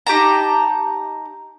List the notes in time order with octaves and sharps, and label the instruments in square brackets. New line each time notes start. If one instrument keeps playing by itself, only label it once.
[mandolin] D#4 G4 A5 A#5